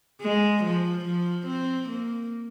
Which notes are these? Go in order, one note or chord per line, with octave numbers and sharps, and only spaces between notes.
G#3
F3
F3
C4
A#3